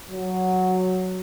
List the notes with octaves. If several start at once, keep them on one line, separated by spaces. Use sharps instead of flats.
F#3